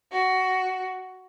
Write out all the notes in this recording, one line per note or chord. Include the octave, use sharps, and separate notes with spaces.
F#4